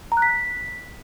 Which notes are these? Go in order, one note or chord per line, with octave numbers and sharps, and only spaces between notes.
A#5
F#6
B6